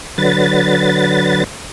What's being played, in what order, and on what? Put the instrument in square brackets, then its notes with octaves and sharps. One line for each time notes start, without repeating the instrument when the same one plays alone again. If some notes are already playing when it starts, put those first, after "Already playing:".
[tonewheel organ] D3 F#3 B4 A6